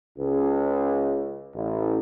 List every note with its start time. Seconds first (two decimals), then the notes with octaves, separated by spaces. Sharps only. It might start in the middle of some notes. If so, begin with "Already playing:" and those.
0.17 C#2
1.54 A1